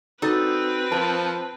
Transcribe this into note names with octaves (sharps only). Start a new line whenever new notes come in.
C4 D#4 F#4 A4 B4 D5
F3 A#4 A5